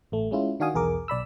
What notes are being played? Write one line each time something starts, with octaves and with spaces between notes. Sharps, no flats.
A1 A3
G#3 C#4 E4 F4
D#3 D4 F#4 F5 G#5 D#6
B1 E2 G#4 A#4 D6
B1 D5 B5 E6